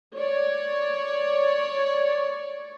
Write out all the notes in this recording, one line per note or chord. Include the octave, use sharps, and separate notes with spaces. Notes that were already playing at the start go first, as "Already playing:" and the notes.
C#5 D5